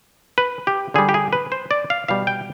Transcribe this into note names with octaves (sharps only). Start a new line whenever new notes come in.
B4
G4
D3 G3 G#4
G4
G#4
B4
C5
D5
F5
B2 G3 F5
G5